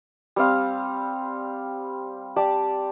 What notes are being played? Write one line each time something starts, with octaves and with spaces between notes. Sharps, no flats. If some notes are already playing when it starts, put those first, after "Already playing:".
G3 C4 F5
G4 D5 A5